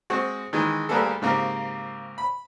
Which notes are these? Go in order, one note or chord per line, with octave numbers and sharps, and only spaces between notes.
G#3 C4 F#4
D#3 E3 G#3
D2 G3 A#3 B3 G#4 A4
G#2 C#3 A#3 C4 G4
B5